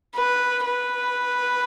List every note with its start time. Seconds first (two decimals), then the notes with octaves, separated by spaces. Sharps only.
0.15 B4
0.65 B4